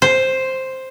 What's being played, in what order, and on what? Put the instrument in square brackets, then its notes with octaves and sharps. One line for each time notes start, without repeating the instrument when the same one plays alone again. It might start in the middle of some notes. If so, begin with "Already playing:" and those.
[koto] C5